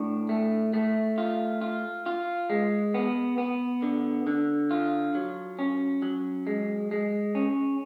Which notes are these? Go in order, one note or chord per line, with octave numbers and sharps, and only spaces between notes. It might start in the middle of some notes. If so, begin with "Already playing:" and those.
Already playing: A2 D4
A3
A3
F4
F4
F4
G#3
B3
B3
D3
D3
F4
F#3
C#4
F#3
G#3
G#3
C#4